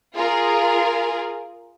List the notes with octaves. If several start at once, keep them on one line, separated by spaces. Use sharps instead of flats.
F4 G#4 A#4